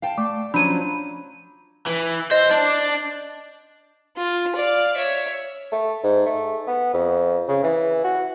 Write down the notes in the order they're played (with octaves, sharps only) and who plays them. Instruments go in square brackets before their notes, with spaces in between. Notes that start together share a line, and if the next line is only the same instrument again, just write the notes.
[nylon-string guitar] F5 G5 A5
[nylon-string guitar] A3 [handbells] D5 D6
[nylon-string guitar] F3 F#3 C#4 [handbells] D4 A#5 [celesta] B5 D#7
[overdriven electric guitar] E3
[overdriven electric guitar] C5 [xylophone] D#5
[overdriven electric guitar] D4
[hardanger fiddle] F4
D5 F5
C#5 E5
[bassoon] A3
G#2
A3
B3
F2
C#3
E3
F#4